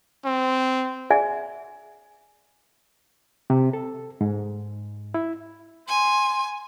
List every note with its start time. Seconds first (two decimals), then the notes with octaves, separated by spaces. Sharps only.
0.25 C4
1.10 G#4 D5 E5 F#5 G#5
3.50 C3
3.73 A4
4.21 G#2
5.14 E4
5.88 G#5 C6